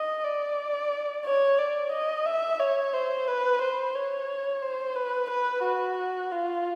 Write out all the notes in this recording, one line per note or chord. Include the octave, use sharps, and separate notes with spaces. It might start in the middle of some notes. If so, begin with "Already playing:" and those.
Already playing: D#5
D5
C#5
D5
D#5
E5
C#5
C5
B4
C5
C#5
C5
B4
B4
F#4
F4